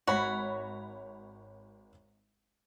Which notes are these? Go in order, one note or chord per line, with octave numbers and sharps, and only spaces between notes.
G#1 F#4 C#5 B5